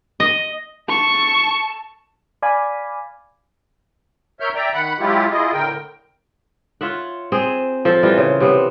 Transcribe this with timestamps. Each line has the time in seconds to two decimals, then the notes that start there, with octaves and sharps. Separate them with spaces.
0.20 D#5
0.89 A5 C#6
2.42 D5 F5 G#5 B5
4.40 A#4 C#5 E5 F6 G6
4.55 D5 E5 G5 A#5
4.74 D#3 F#5 B5 F#6
5.00 F#3 G#3 E4 F4 G4
5.31 E4 F4 G#4 D#5
5.53 A2 D3 A#4 G5
6.81 F4 C#5 E5 F#5
7.32 C4 G#4
7.85 F3 A4
8.03 E3 G3 F4
8.18 C#3
8.40 C3 B3 C4